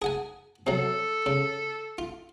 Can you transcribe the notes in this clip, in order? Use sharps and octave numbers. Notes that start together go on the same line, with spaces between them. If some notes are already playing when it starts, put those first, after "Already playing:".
G#4 F#5 G#5
C3 F#3 A4
C#3
F4